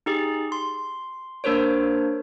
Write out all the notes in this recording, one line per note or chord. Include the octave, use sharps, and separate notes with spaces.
D#4 G4 G#4
C6
A#3 D4 A#4 C5 C#5